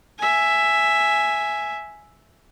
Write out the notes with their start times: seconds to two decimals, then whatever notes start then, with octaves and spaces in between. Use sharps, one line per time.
0.18 E5 G#5